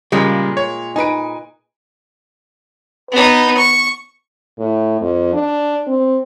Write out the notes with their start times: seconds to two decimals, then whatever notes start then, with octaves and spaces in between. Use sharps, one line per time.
0.12 A#2 C#3 G3 G#3 A#3
0.57 C#5
0.96 D#4 B4 G#5 D7
3.11 B3 D#4 B4
3.57 C#6
4.59 A2
5.01 F2
5.34 D4
5.87 C4